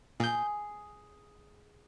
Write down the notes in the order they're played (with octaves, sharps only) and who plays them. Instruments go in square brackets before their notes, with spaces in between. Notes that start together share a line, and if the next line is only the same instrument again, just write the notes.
[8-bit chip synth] A#2 G6 [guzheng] G#4